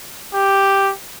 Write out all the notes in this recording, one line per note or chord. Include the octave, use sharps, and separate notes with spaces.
G4